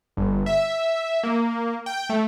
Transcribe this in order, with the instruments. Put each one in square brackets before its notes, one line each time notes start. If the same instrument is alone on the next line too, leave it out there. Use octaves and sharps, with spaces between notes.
[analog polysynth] G1
E5
A#3
G5
A3